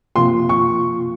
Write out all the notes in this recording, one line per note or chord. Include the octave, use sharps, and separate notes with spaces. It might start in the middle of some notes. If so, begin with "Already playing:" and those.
C3 F3 A#3 F4 C6
C#6